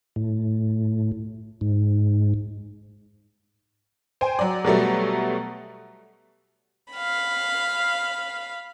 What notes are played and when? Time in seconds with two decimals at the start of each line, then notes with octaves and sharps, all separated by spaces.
0.16 A2
1.61 G#2
4.21 C5 G5 G#5
4.39 F#3 D5
4.64 B2 F#3 G3 A3
6.93 F5 B5